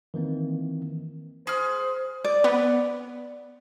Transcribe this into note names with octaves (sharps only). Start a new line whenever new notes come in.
D#3 E3 A#3 C4
G#4 C5 F6
D5
B3